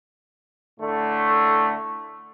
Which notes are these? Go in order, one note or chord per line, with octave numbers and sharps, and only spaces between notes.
A2 D3 A3